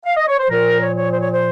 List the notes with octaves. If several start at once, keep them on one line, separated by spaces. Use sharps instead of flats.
F5
D#5
C#5
C5
A#2 F3 A#4
C#5
C#5
C5
C#5
C5